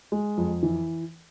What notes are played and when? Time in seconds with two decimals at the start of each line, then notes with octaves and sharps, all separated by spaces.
0.12 G#3
0.37 F2
0.63 E3